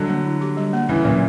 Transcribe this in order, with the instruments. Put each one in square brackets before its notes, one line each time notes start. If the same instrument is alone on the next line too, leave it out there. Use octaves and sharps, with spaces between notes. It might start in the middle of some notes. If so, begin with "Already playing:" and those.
Already playing: [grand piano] D3 F#3 [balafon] G3
[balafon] A#3
E4
G4
G3
A#3
[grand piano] C#3 E3 [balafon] E4
[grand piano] A#2 [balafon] F#3